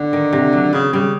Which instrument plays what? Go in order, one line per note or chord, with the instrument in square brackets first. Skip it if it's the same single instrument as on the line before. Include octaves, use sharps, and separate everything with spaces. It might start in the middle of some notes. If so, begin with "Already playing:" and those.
Already playing: [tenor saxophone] D3 [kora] B3
[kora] D#3
C3
F#3
[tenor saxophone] C#3 [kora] B3
[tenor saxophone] C#3 [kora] G3